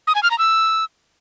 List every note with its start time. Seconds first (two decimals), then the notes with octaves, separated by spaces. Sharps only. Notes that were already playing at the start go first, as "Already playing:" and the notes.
0.07 D#6
0.15 G#5
0.23 F6
0.31 A#5
0.38 E6